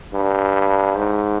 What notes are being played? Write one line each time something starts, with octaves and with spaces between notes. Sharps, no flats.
G2
G#2